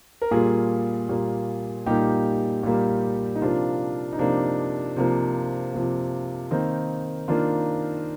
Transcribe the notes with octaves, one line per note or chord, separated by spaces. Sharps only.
A#4
A#2 G3 A#3 F4 G#4
A#2 G3 A#3
A#2 G3 A#3 D#4 G4
A#2 G3 A#3
D#4
C3 F3 A#3 D4 F4
D#4
C3 F3 A#3 D4
C3 F3 A#3
C3 F3 A#3
D#3 A#3 C4 D#4
D#3 A#3 D4 F4